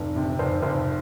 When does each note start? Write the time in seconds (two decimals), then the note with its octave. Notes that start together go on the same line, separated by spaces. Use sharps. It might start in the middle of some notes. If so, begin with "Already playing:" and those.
Already playing: F1
0.16 C3 D4
0.39 F1 C5
0.63 F1 C5